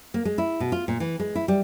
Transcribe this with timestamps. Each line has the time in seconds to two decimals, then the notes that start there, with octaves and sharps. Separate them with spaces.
0.14 A#3
0.25 G#3
0.38 E4
0.60 B2
0.72 F4
0.88 A#2
1.00 E3
1.20 G#3
1.35 E4
1.48 G3